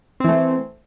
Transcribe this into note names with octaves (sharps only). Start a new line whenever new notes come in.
E3 A3 C4